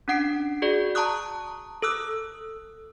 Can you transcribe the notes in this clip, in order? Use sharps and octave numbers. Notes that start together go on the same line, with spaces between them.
C#4 D4 F#5 C7 D7
F#4 G#4 D5
A5 A#5 C#6 D#6 F#6
A4 D#6 E6 F#6